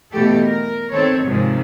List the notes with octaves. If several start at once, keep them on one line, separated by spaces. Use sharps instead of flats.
B2 E3 A3 G4 A4
A#4
D#3 C4 A4 C#5
G#2 C3 D#3 F3